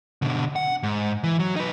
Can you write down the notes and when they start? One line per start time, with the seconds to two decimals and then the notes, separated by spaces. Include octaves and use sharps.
0.22 B2 D3
0.56 F#5
0.83 G#2
1.24 E3
1.39 F#3
1.56 D#4 B4